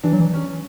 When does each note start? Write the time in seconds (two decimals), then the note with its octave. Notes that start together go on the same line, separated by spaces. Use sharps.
0.03 E3 D4
0.13 F#3
0.20 E3
0.33 C#4